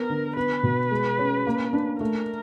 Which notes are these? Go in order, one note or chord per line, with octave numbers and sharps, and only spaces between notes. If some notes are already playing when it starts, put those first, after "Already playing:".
Already playing: B3 A#4
D3
B3 B4
B2
G#3
C#4
A#3
D4
A3 A#4